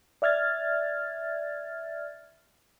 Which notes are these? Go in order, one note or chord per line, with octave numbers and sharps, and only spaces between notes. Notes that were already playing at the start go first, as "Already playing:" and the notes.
D5 E5 F6 G#6 A6